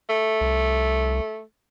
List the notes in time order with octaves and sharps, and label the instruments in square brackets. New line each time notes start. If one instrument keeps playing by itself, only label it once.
[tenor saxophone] A3
[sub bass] C2